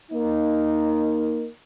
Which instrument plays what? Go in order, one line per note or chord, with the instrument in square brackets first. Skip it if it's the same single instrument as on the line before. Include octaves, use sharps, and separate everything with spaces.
[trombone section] A#3 D#4